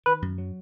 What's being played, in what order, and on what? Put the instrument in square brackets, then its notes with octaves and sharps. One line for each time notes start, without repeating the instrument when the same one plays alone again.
[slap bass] D#3 [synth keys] B4
[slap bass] F#2
F#3